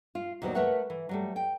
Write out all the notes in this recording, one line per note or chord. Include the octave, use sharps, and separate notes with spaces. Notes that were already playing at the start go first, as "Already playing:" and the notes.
F4
D#2 B2 F#3 D#4 C5 D5
A3 A#4 B4 C#5 E5 F#5
E3
F#3 G3 A3
G5